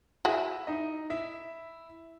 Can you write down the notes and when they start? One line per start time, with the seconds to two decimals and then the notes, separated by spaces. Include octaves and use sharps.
0.25 E4 F#4 G#4 E5
0.67 D#4 D#5
1.10 E4 E5